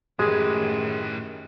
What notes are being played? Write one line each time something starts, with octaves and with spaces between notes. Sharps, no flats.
F#2 A2 D#3 G#3 G4 G#4 B4